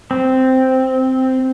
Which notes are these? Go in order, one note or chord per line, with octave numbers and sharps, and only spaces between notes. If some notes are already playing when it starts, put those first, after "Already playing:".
C4